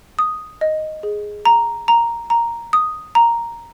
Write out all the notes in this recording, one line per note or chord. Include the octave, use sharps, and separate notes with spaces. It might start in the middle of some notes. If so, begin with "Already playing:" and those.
D#6
D#5
G#4
A#5
A#5
A#5
D#6
A#5